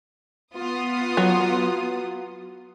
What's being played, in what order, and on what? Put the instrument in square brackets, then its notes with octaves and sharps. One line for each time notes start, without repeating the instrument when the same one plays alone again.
[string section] B3 F4 D#6
[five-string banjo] F#3